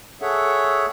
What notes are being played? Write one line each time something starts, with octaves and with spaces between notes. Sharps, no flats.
G#4 A4 C#5 E5 F#5